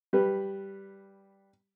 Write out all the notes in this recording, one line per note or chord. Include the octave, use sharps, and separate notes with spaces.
G3 B4